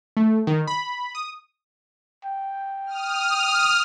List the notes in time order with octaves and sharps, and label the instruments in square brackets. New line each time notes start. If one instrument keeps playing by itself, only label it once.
[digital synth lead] A3
D#3
B5
D#6
[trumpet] G5
[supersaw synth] D#6 F6